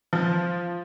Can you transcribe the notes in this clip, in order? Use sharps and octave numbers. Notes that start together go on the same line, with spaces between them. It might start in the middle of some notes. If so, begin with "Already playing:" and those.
F3